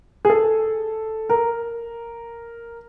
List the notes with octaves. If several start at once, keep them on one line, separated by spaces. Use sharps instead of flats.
G#4
A4
A#4